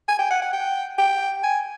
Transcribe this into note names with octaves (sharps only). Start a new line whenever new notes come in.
G#5
G5
F#5
F#5
G5
G5
G#5